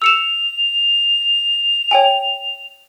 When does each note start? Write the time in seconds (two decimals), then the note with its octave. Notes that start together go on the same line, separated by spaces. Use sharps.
0.02 E6 C#7 E7 F7
1.91 C#5 G5 G#5